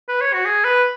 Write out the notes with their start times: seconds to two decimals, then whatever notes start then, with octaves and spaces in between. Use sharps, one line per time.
0.08 B4
0.21 C#5
0.33 F#4
0.45 G#4
0.64 B4